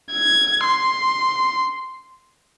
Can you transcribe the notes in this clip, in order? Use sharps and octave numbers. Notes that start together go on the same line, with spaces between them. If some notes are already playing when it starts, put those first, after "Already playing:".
G#6
C6